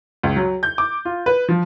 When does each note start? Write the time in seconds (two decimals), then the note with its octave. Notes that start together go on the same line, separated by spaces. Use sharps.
0.23 C#2
0.36 F#3
0.63 G6
0.78 D6
1.05 F4
1.26 B4
1.49 F3